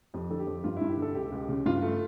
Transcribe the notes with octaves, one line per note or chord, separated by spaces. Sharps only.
F2 G4
D3 A4
G4
F2
G2 F4
G2 E4
G4
D3 A4
C#2 G4
C#2
C#3
G2 F4
A3